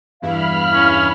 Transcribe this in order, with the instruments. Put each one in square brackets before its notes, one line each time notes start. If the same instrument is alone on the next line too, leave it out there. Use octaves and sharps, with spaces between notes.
[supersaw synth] E2 G2 E4 [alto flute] F5 [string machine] B5 F6
[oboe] C#4